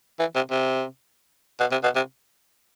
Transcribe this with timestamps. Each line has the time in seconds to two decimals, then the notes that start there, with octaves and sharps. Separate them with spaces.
0.19 E3
0.35 C3
0.51 C3
1.60 B2
1.71 C3
1.83 B2
1.96 C3